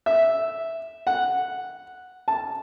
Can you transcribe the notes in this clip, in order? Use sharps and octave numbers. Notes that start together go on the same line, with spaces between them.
E5
F#5
A5